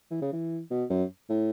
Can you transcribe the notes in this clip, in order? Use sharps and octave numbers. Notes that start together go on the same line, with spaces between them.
E3
C#3
E3
B2
F#2
A2